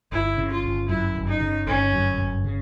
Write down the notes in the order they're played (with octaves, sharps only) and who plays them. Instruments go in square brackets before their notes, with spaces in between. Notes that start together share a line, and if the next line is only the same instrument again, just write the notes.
[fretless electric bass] G1 [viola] E4
[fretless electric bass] C#3
[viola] F4
[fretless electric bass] G1
[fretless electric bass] F#2 [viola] E4
[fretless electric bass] G1
[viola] D#4
[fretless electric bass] C#3
[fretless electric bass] G1 [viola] C#4
[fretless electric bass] F#2
G1
C#3